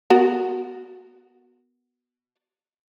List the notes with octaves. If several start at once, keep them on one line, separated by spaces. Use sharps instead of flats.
B3 F#4 A#4